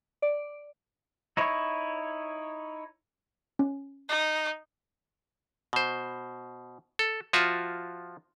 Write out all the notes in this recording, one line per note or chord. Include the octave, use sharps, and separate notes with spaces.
D5
D#4 E4 C#5
C#4
D#4
B2 C5
A4
F3 F4 F#4 E5